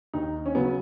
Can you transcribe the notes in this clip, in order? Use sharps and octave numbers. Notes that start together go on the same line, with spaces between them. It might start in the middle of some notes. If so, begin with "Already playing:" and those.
D#2 D#4
C#4
C#3 F#3 B3